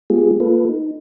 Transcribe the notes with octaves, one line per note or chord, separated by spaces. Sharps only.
G#3 B3 F4 G4 G#4
A#3 F4 A4 B4
D#4